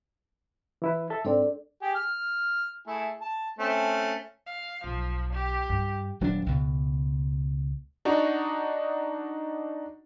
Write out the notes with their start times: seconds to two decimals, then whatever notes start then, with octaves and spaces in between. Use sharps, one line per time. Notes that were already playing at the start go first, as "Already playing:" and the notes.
0.82 E3 E4 B4
1.10 A4 E5
1.25 G#2 C4 D4 A4 D5
1.82 G4 G#4
1.95 F6
2.87 A3 E4 G#4
3.21 A5
3.59 A3 C4 C#4
4.46 F5
4.84 B1 F3
5.32 G4
5.69 G2
6.21 D#1 F#3 C#4 D4
6.46 C#2 B2
8.05 D4 D#4 F#4